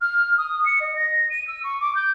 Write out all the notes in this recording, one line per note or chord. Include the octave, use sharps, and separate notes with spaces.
F6
D#6
C#7
D#5
A#6
D#7
E6
C#6
D6
G6